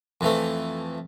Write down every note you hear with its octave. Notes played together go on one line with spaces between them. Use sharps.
F2 E3 A3